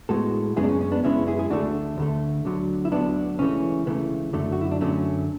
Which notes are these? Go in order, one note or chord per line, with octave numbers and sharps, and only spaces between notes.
A2 G#3 B3 F#4 A4
F#2 C#3 G#3 B3 E4 G#4
D4
C#4
C#4
B3 D4
F#2 C#3 G#3 B3 C#4 E4
E4 G#4
G#4
D2 D3 A3 D4 F#4
D2 D3 A3
D2 D3 F#3
E4
D2 D3 F#3 B3 D4
C#2 C#3 E3 A3 C#4
C#2 C#3 E3 A3 B3
F#2 D3 F#3 A3
F#4
E4
D4
F#2 D3 F#3 A3 C#4